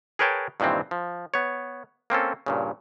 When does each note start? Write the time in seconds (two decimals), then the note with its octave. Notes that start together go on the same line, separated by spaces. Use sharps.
0.19 G#4 A#4 B4 C#5 G5 A5
0.60 G2 A#2 D#3 E3 C4
0.91 F3
1.34 B3 C#5
2.10 A#3 C4 C#4 A4
2.46 G2 A#2 C#3